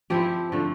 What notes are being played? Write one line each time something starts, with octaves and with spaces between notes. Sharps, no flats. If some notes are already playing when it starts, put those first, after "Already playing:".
F3 C4 E4 G4
D3 F3 A3